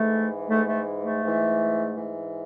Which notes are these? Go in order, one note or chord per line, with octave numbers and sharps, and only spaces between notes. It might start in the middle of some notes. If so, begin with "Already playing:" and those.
Already playing: G#2 E3 A3
G#2 E3 A3
A3
A3
G#2 E3
G#2 E3